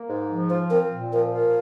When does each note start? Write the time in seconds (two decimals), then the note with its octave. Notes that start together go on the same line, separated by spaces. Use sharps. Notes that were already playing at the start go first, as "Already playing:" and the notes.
Already playing: A#3
0.08 G#2
0.29 F3
0.49 F4 C5
0.70 C4 A#4
0.92 A#2
1.13 F3 A#4
1.34 F4 A#4